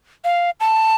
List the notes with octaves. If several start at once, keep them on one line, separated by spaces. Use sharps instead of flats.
F5
A5